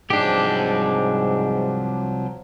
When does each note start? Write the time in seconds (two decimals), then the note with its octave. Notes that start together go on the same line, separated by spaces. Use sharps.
0.10 C2 G#2 F3 F#3 D4 G4 G5